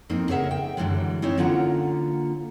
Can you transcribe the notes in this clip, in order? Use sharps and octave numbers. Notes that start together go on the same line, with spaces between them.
F2 A#3 C4 D#4
C#3 G#4 A#4 E5 F#5
G5
F#2 B2 D3 E3 G3 G#3
C4 C#4 D#4 E4 C#5
D3 A#3 C#4 F4 F#5 A#5